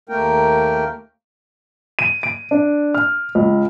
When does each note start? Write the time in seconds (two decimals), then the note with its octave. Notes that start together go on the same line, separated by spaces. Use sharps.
0.09 D#2 A3 A#3 A#4 G5
1.99 D#7
2.23 D7
2.51 D4
2.94 F6
3.35 C#2